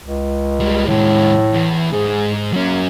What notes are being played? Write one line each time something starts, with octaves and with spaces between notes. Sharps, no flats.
C#2
G3 G#3
D#2 A2 G#3
E2
G#2 G#4
F#3 A#3 C#4